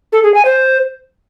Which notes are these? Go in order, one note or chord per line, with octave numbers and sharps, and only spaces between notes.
A4
G#4
G#5
C5